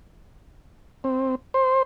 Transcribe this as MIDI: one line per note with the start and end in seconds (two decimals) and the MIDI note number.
1.04 1.35 60
1.54 1.83 72